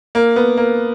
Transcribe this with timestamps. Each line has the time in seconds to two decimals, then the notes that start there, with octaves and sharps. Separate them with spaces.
0.15 A#3
0.36 B3
0.58 A#3